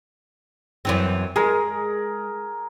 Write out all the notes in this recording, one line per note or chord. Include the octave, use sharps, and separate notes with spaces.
F#2 E3 C4
G#3 G#4 A#4